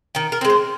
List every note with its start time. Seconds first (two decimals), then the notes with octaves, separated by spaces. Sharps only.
0.15 D#3 G5
0.32 A#4
0.41 G#3 C4
0.50 C5